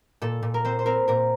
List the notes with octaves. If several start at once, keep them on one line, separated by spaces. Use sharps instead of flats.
A#2 A4
A#2
A#4
C4 C5
C5
C4 A#4
A#2 A#4